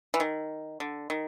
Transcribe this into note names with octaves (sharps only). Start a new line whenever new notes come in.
E3
D#3
D3
D#3